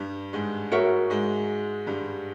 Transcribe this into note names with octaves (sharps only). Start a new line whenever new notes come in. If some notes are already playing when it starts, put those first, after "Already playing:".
Already playing: G2 G3
G#2 G#3
F#4 A#4 C#5 E5
G#2 G#3
G2 G3